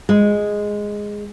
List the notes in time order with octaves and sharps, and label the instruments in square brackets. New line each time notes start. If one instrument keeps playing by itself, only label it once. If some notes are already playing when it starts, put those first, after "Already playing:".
[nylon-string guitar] G#3